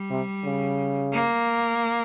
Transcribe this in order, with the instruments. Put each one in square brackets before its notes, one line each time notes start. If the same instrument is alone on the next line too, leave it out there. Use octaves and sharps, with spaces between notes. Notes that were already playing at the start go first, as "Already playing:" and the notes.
Already playing: [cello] G3
[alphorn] C3
C#3
[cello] A#3